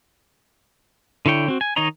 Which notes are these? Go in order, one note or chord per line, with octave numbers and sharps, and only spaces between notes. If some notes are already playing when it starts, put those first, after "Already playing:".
D3 E4 C#5 G5
C4 F#4
G#5
D#3 D#4 C#5 D#5 A#5